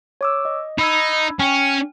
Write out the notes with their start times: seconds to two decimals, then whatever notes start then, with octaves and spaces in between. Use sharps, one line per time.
0.21 C#5 D6 E6
0.45 D#5
0.79 D#4 B5 E6 G#6
1.39 C#4 G5 G#5 F6